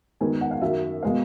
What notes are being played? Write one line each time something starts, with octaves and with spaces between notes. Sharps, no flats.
F#2 D#3 G#3 B3 G#5
F#5
F5
F#2 D#3 F#3 E5
B2 G#3 B3 F5